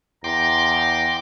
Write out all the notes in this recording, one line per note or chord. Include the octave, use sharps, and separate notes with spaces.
E2 G5 A#5 C6 D6